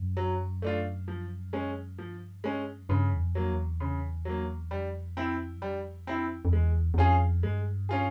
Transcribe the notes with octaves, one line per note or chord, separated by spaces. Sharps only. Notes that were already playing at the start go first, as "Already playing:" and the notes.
Already playing: F#2
F#3
A3 D4 F4
F3
G#3 C#4
G2 F3
G#3 C#4
F#2
G2 C#3
E2
F2
F#3 A#3
E2
C#3
F#3 A#3
F2 G3
C4 E4
F#2
F2 G3
C4 E4
F2
E2 G#3
E2
F2 C#4 F4 G#4
G2 G#3
C#4 F4 G#4